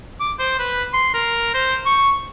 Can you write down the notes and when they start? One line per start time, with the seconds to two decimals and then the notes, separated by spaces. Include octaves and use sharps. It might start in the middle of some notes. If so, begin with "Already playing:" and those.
0.20 D6
0.39 C5
0.59 B4
0.93 C6
1.14 A#4
1.54 C5
1.86 C#6